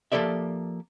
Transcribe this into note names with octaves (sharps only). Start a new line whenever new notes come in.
F3 A#3 G4 A4 D5 E5